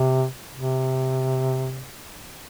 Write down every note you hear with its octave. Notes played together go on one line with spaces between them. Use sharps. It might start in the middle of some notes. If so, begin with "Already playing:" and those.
Already playing: C3
C3